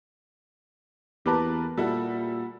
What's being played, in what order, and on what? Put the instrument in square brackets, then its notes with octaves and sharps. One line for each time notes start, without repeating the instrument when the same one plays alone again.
[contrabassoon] E2 [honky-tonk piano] A#3 A#4 [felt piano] G4 B4 A5
[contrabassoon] A#2 [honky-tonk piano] G3 E4 F#4 [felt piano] A4